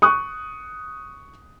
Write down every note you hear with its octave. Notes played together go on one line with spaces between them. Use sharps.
C#6 D#6 F#6